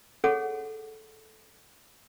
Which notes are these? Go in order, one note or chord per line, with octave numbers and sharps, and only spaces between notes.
G#4 A4 C#5 F#5